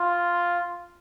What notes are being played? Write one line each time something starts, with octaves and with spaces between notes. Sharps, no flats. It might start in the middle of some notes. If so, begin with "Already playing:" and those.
Already playing: F4